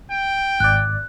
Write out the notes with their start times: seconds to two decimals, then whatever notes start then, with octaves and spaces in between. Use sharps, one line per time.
0.12 G5
0.60 G#1 D5 F#6